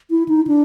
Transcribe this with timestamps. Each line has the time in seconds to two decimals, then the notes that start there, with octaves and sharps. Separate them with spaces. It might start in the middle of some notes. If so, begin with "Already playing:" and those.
0.11 E4
0.28 D#4
0.47 D4